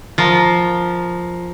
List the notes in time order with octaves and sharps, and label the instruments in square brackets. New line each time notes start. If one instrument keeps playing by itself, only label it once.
[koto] F3 A#4